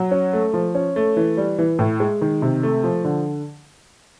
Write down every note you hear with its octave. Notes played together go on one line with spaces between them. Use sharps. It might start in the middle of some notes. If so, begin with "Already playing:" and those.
Already playing: F#3
C#4
A3
F3
C#4
A3
E3
G3
E3
A2
G#3
D#3
C3
A3
F3
D3